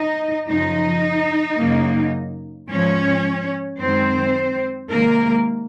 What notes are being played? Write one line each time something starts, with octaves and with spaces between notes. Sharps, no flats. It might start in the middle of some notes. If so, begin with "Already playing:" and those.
Already playing: D#4 D#5
F#2 C#3 F3 D#4 D#5
F#2 C#3 F#3 A#3
G#2 F3 G#3 C#4 C#5
F#2 D#3 G#3 C4 C5
C3 D#3 G#3 A#3 A#4